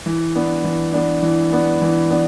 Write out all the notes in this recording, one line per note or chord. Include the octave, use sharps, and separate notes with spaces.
E3
B3 D4
E3
B3 D4
E3
B3 D4
E3
B3 D4